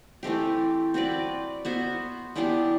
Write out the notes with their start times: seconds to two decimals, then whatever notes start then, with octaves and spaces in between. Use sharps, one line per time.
0.23 E3 A3 C4 G4
0.94 C4 F#4 B4 D5
1.65 B3 F#4 C5 E5
2.36 E3 B3 D4 G4